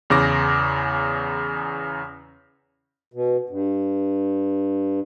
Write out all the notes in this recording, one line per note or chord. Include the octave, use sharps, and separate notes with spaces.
E2 C#3 D6 A#6
B2
G2